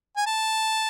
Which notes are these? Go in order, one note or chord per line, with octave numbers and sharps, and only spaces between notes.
G#5
A5